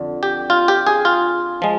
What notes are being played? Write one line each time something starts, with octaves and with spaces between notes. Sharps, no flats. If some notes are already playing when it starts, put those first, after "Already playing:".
Already playing: F2 D3
G4
F4
G4
G#4
F4
F3 G#3